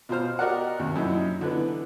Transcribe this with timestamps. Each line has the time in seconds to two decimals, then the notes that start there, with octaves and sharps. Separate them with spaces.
0.09 B2 F4 C5 F6
0.39 F#4 G4 A#4 D5 D#5 F#5
0.79 D#2 C3
0.95 F#2 A#2 F3 D#4 E4
1.41 D3 E3 B3